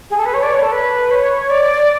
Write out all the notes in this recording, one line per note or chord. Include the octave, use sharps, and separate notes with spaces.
G#4
A4
B4
C#5
D5
C#5
A4
B4
C#5
D5